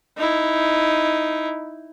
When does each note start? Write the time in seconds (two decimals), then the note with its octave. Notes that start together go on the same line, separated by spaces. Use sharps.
0.18 D#4 E4